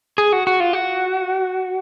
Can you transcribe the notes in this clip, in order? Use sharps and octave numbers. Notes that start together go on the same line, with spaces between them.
G#4
F#4
F#4
F4
F#4